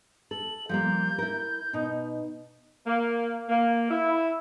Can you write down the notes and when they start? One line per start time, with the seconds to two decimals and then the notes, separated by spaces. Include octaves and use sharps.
0.31 A4 F#7
0.69 F3 G3 A#3 G6
1.19 E4 A#4
1.73 B2 D#4
2.87 A#3
3.49 A#3
3.91 E4